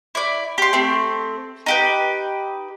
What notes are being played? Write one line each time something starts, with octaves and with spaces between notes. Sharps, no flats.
E4 D5
G4 C6
A3 C4
D#4 G4 B4